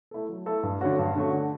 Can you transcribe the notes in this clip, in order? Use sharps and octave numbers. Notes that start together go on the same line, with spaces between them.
A3 E4 A4
F#3
A3 E4 A4
G2
D3 A3 C#4 F#4
G2
D3 A3 C#4 F#4
D3